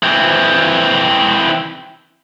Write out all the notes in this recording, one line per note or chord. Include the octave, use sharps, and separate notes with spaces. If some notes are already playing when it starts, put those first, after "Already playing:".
E3 C4